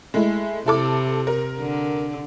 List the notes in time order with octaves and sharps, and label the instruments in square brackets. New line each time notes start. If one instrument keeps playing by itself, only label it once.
[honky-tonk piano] G#3 A3 E4
[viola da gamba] C3 [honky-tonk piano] E4 A4 D6
[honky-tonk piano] A#4
[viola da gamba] D3